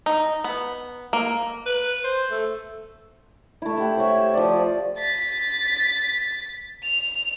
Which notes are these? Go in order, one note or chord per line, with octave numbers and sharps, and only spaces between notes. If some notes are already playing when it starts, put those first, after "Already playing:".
D#4
B3
A#3
B4
C5
A3
A3 E4
E4 G4 F#5
C5 C#5 E5
F3 D5
A6 B6
F7